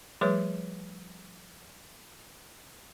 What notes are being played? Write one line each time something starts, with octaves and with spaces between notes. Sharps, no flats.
F3 G3 A3 G#4 B4 C#5